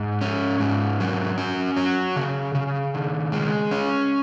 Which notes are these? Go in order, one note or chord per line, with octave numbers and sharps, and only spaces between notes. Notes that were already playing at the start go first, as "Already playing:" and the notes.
Already playing: G#2
C#4
G#2
F#3
C#4
F#3
C#3
C#3
D#3
G#3
C#4